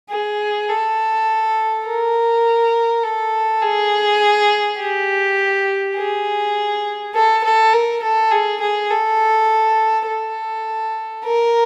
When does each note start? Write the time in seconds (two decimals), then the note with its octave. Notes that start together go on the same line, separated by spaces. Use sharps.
0.10 G#4
0.69 A4
1.86 A#4
3.04 A4
3.62 G#4
4.79 G4
5.97 G#4
7.15 A4
7.44 A4
7.74 A#4
8.02 A4
8.31 G#4
8.61 G#4
8.90 A4
10.07 A4
11.25 A#4